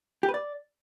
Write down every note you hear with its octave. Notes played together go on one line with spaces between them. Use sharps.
G4
B4
D5